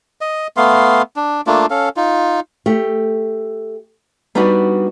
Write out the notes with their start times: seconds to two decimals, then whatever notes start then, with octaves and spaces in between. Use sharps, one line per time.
0.21 D#5
0.57 A3 B3 F5 C6
1.16 D4
1.47 A3 A#3 D4 F4
1.70 C#4 A4 F5
1.97 D#4 F4
2.66 A3 G4
4.35 G3 B3 D4 D#4 F#4 G4